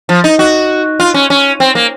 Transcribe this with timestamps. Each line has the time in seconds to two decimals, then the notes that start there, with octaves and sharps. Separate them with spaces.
0.09 F3
0.24 D#4
0.39 F#4
1.00 F4
1.14 C#4
1.30 C#4
1.60 C4
1.75 A#3